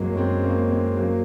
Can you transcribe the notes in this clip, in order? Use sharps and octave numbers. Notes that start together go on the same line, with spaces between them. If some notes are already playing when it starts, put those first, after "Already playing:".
Already playing: F#2 F#3 G#3 A#3 C4
C#4
G#3 C4
A#3 C#4
G#3 C4
F#3 A#3